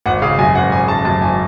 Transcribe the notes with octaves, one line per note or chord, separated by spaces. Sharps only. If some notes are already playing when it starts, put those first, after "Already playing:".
G#1 F#5
C#3 F5
F#2 G#5
G#1 F#5
G#1 G#5
C#3 A5
F#2 A5
G#1 G#5